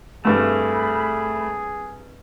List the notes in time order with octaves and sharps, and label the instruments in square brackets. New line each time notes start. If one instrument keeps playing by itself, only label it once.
[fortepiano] C2 G2 [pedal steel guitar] A3 [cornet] G#4 [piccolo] B5